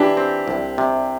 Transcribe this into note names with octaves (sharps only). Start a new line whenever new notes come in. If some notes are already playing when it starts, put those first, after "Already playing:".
Already playing: E3 D4 G4
C4
C2
C3